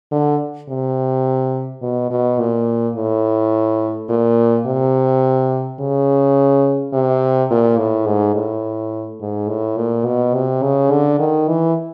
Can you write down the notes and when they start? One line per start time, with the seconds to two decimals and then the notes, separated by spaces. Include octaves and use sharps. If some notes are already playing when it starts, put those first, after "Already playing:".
0.12 D3
0.69 C3
1.82 B2
2.11 B2
2.39 A#2
2.96 A2
4.09 A#2
4.66 C3
5.80 C#3
6.93 C3
7.50 A#2
7.79 A2
8.07 G#2
8.35 A2
9.21 G#2
9.49 A2
9.77 A#2
10.06 B2
10.34 C3
10.62 C#3
10.91 D3
11.19 D#3
11.48 E3